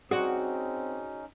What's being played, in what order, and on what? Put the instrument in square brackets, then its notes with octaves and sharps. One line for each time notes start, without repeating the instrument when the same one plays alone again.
[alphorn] C4 [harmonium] C#4 D#4 [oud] F#4 [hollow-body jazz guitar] G#4 C5 D5